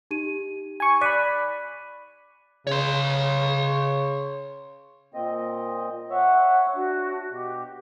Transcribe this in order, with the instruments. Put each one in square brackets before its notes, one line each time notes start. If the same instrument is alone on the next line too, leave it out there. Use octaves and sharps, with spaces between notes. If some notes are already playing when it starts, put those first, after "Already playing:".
[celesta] D#4 G4 D#7
[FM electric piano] G#5 C#6
[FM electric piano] D5 B5 [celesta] F#6 B6 D#7
[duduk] C#3 [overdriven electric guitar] C#5 C6
[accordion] A#2 C4 D#5
[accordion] C#5 E5 [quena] F#5
[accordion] D4 [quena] F#4
[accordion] B2 [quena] G4